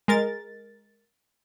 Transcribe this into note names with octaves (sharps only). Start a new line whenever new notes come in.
G#3 A#4 A6